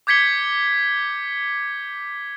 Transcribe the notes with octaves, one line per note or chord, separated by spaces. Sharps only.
D6 G6 G#6 B6 C#7 G7